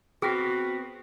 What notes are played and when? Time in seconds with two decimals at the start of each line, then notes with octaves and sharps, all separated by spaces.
0.22 B3 C4 F#4 G#4 B4 G5 F6 A#6